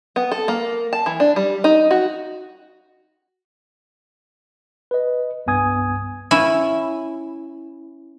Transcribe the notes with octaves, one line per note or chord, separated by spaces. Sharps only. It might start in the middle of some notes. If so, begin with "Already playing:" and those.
B3
A4
A#3
A5
E3
D4
G3
D#4
F#4
B4 D#5
C2 G2 B3 G#5 D#6 G#6
C#4 E4